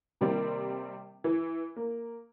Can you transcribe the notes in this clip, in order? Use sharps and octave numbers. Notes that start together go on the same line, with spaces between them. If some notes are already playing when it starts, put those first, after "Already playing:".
C3 D#3 G3 A#3 C4
E3
A#3